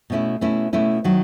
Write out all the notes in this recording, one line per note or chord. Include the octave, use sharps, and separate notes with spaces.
B2 A3 C#4 E4
B2 A3 C#4 E4
B2 A3 C#4 E4
D#3 F#3 F#4